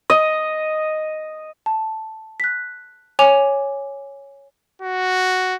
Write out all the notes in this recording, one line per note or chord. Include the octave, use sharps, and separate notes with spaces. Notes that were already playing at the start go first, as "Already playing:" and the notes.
D#5
A5
F#6 B6
C#5 G#5 D6 F7
F#4